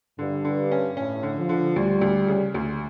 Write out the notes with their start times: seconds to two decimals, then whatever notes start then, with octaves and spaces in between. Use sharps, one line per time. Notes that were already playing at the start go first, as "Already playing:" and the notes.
0.19 G2 D3
0.44 D3
0.71 C#4
0.97 A2 C#4
1.23 D3
1.37 F3
1.49 D3
1.76 D2 G3
2.01 D2
2.28 C#3
2.55 D2